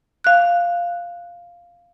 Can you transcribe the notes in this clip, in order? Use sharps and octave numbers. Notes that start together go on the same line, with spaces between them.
F5 F#6